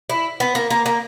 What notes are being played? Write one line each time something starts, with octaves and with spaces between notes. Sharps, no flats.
E4
B3
A#3
A#3
A#3